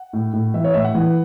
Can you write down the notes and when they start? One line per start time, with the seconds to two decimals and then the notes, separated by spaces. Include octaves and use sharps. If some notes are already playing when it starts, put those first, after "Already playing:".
Already playing: F#5
0.13 A2
0.33 A2
0.54 E3 E5
0.64 C#5
0.74 A2 E5
0.84 F#5
0.95 E3